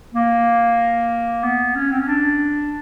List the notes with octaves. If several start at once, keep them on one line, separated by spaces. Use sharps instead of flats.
A#3
B3
C#4
C4
C#4
D4